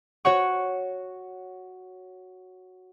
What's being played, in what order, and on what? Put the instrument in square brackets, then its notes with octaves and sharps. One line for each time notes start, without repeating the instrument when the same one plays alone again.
[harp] F#4 C#5 F#5 C#6